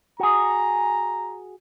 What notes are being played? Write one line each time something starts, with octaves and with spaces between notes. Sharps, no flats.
F#4 G#4 A#5